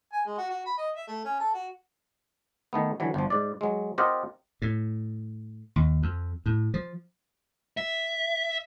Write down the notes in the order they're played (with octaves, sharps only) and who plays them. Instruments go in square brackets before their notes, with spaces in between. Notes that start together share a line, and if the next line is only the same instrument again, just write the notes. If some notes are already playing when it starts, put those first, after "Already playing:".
[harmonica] G#5
G#3
F#4
F#4
B5
D#5
E5
A3
C#4
A4
F#4
[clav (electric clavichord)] D#3 A3 B3
D3 E3 F#3
G1 F3
G#2 D5
F#3 G#3
C4 F4 G4 A#4 D#5 F#5
[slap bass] A2
D#2
F2
A2
F3
[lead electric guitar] E5